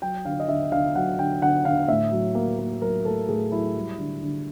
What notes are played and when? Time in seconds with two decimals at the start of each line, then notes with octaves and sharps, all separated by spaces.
0.02 F#3 G5
0.25 D3 F5
0.40 D#5
0.48 D3 E5
0.72 D3 F5
0.95 F#3 F#5
1.19 D3 G5
1.42 D3 F#5
1.65 D3 F5
1.88 A2 E5
2.12 F#3
2.35 A#3
2.58 A#3
2.81 F#3 A#4
3.05 A2 A4
3.28 A2 G#4
3.52 F#3 E4
3.75 G3
3.98 D3
4.22 D3